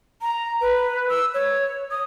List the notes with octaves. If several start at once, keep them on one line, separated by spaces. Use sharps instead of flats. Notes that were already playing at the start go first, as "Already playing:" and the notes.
A#5
B4
E6
C#5
D#6